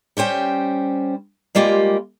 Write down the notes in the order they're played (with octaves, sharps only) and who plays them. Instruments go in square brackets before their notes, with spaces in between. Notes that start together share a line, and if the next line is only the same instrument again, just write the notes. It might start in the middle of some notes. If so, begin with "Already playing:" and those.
[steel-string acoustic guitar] G3 C#4 C5 G5
G3 G#3 A#3 F4 G4